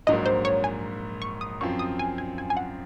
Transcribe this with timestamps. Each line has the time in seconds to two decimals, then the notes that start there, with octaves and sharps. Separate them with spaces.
0.07 A#1 G#2 F#3 A#3 D#5
0.26 C5
0.45 C#5
0.64 G#5
1.22 C#6
1.41 D#6
1.61 F#2 F3 C4 C#6
1.79 D#6
1.99 G#5
2.18 G#5
2.38 G#5
2.50 G#5
2.57 F#5